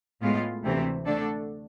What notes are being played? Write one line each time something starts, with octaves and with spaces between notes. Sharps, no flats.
A2 G#3 B3 F4
D2 C3 E3 A3 C4
D3 A3 D4 A4